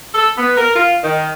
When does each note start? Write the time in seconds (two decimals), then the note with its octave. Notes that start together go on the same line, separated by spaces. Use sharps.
0.14 A4
0.37 B3
0.57 A#4
0.75 F4
1.03 D#3